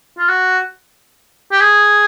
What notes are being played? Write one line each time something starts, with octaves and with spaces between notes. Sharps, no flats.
F4
F#4
G4
G#4